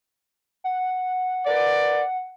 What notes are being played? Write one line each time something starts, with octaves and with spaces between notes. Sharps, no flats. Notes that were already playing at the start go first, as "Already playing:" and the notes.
F#5
A#4 B4 D5